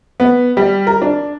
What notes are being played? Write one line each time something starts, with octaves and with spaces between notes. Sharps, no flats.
B3
G3
A#4
D4